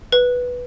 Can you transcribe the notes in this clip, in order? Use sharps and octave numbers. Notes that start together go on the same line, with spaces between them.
B4